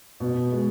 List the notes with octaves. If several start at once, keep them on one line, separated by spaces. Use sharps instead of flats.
B2
G#3